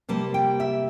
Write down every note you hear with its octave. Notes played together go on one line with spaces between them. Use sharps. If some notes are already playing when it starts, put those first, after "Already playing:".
C3 G3 A#3 A5
G5
E5